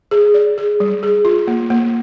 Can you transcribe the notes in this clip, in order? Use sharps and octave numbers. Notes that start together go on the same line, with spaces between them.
G#4
D5
G#4
G3
G#4
F4
A#3
A#3